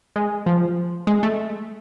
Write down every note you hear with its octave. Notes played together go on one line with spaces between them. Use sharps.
G#3
F3
G#3
A3